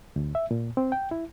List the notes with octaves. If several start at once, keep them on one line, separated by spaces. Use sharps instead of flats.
D2
E5
A#2
C4
G5
E4